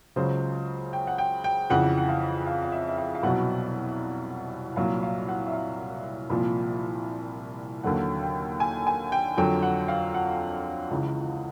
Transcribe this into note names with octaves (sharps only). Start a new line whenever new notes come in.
C#2 C#3 F#3 C5
G5
F#5
G5
G5
F2 C#3 E3 F#5
F#5
F5
F5
F5
E5
E5
F5
F5
C2 B2 F#3 F#5
C2 A#2 F#3 F5
F5
F#5
E5
F5
C2 A#2 F3
D#2 D3 F#3 F#5
G5
G#5
G#5
G5
F2 D3 F#3 G5
F#5
F5
F#5
C#2 C#3 E3